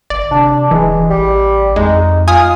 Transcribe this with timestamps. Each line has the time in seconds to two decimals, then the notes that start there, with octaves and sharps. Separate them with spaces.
0.10 G1 D5
0.31 C3 D4
0.71 E1 E3 G#3
1.10 A1 G3
1.76 F2 G#3 D#4
2.28 F4 G#5 D#6 F6